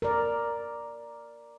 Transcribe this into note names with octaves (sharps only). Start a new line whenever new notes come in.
A#4 D5